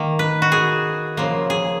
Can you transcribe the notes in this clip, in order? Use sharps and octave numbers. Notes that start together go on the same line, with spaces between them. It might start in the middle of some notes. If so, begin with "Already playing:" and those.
Already playing: D#3 A#3
B4
F#4
G#4
C#3 F3 A#3
G#4